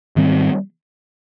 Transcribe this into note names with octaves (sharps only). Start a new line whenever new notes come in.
G#2 D#3 G3 C4